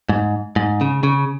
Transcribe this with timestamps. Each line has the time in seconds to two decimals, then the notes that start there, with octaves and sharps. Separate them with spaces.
0.09 G#2
0.56 G#2
0.81 C#3
1.03 C#3